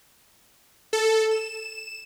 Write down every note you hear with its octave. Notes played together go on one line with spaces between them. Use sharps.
A4
E7